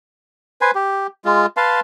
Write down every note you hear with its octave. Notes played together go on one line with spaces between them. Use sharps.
B4 C5 G#5
G4
G#3 F4
B4 F5 A5 C6